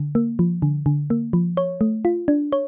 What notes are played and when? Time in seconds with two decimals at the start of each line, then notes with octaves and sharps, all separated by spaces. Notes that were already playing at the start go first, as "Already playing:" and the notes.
Already playing: D3
0.15 A#3
0.39 F3
0.62 D3
0.86 D3
1.10 A#3
1.33 F3
1.57 C#5
1.81 A3
2.05 F4
2.28 D4
2.52 C#5